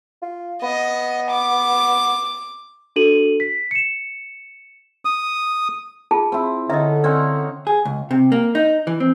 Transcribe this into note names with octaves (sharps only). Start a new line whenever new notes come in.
F4
B3 D#5
D6
D4 F#4 A4 D#7 F#7
B6
C#7 E7
D#6
F4 G#4 A5
C4 E4
D3 C#4 D#4 D#5 E5
C4 C#4 D5 F#5
G#4
C#2
C3
A#3
D#4
E3
C4